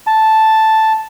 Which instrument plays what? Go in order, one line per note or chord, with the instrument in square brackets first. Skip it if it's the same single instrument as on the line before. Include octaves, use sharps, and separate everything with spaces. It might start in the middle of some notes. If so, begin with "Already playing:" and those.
[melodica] A5